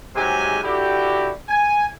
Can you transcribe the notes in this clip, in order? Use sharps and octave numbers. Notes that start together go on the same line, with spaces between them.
G#2 C3 F#3 G#3 G4 G#5
D3 E4 F#4 G4
G#5